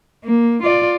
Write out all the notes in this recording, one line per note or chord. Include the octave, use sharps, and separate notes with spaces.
A#3
F4 D5